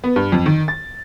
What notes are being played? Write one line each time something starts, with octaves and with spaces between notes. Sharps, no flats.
B3
G2
F2
D#3
A6